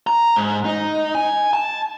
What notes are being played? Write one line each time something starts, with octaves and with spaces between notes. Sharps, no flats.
A#5
G#2
D#4
G#5
A5